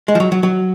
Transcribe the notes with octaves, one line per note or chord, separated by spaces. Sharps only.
G#3
F3
F#3
F#3
F#3